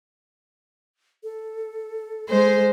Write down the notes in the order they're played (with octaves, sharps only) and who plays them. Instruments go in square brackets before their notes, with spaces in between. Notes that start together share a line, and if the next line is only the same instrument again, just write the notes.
[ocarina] A4
[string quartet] G#3 [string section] C5